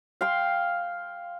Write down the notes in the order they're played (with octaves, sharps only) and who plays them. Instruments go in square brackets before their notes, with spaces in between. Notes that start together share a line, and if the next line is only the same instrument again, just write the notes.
[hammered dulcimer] F5 G5 C6